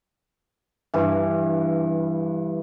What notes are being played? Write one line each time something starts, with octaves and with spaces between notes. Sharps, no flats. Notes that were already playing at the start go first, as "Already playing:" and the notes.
G2 E3